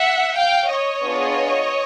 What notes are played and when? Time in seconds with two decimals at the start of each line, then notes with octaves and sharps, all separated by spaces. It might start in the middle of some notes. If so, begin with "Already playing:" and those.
Already playing: E5 F#5
0.35 F5 G5
0.69 C#5 D#5
1.03 B3 D4 F4 G#4